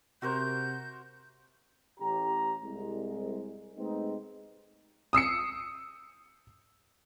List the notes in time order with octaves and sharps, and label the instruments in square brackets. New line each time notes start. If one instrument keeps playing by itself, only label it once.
[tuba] C3 [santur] F#4 A#4 C5 [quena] G6
[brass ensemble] A1 G4 A#5
C2 G#3
C3 G#3 A3 B3 C4 D#4
[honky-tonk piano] D#6 E6 C7 C#7